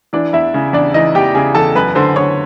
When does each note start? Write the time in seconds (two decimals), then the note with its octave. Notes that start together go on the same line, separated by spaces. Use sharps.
0.13 E3 D4 D5
0.33 E2 E4 E5
0.54 C#3
0.73 E2 D4 D5
0.94 E3 D#4 D#5
1.15 E2 G4 G5
1.35 C#3 G#4 G#5
1.55 E2 A4 A5
1.75 F#2 B4 B5
1.95 D3 C5 C6
2.16 D3 C#5 C#6